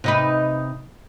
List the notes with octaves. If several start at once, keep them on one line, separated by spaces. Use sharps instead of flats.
C3 D#4 B4